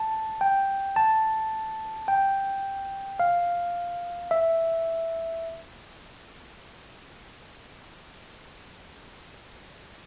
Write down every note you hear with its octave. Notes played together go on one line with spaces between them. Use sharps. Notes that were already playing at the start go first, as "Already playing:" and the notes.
Already playing: A5
G5
A5
G5
F5
E5